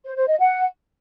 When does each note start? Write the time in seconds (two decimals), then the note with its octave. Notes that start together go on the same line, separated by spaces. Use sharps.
0.05 C5
0.16 C5
0.28 D#5
0.40 F#5